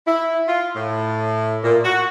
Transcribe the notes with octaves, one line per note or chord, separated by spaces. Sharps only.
E4
F4
A2
A#2
F#4